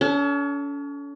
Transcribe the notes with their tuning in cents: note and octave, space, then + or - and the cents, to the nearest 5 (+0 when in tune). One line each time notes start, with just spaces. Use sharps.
C#4 +40 A4 +0